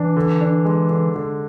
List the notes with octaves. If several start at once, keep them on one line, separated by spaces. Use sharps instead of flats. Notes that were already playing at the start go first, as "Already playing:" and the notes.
Already playing: E3 D4
D3
D4
G#3
D3
D3